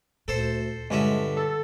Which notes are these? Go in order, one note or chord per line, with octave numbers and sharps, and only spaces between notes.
D2 A#2 A4 C5
G2 D3 G#3 C#4 E4
A4